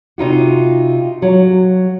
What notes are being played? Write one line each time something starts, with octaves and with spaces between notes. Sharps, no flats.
C3 D#4 F4 F#4
F#3